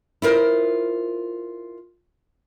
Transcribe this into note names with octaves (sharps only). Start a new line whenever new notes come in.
E4 F4 A#4 C5